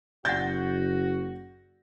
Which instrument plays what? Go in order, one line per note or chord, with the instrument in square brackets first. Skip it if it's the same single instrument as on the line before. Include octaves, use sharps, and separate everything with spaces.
[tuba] F#1 [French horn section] F#4 [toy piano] D5 F#5 [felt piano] G6 A6 A#6